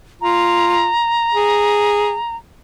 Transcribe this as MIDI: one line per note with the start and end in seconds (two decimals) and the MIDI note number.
0.21 0.89 65
0.21 2.36 82
1.34 2.16 68